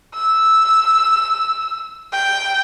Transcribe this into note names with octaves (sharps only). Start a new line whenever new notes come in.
E6
G5